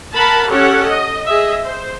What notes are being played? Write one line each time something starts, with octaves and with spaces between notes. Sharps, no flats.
A#4 F#5 A5 B5
C#4 G4 A4 C#5 F#5
D#5
G#4 D#5 E5
C5